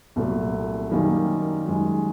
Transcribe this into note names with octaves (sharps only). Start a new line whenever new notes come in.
C2 A#2 F#3 A3
F#2 D#3 G3 A#3
F#2 D#3 G#3